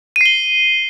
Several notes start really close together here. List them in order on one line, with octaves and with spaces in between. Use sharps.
D#7 C7 G7